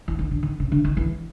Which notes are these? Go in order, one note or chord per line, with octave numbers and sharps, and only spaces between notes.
E3
D#3
D3
D#3
C#3
D3
D#3
E3